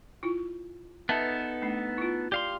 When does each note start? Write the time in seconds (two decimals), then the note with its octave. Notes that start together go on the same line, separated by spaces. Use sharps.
0.23 E4 F4
1.09 B3 D#4 A4 B4 E5 A5
1.62 A3 D4
1.98 E4 F4
2.32 G4 D5 F5 C6